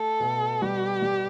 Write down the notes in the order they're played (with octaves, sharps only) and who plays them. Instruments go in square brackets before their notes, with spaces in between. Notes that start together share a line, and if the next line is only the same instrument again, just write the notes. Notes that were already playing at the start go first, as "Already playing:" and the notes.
Already playing: [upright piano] A3 [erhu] A4
[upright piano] B2
[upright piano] G3 [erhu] G4
[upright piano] G3